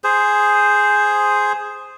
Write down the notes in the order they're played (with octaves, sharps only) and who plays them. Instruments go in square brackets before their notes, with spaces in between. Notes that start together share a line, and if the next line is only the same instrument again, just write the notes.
[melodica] G#4 C5